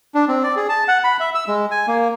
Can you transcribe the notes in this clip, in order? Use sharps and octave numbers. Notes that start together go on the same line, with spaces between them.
D4
C4
D5
G#4
A5
F#5
B5
E5
E6
G#3
G#5
A#3